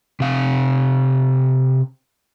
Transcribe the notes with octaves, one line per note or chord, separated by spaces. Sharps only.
C3 F5